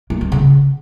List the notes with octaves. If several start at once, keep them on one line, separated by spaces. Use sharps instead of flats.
A#3
C4
C#3